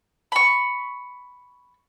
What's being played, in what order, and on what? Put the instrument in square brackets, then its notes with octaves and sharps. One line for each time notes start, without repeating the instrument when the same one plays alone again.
[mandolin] B5 C#6